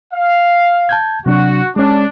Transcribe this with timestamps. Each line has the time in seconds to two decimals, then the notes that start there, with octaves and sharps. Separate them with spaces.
0.14 F5
0.89 A5 G6 G#6
1.26 C3 F#3 D4 F#4
1.76 G#3 C#4 D4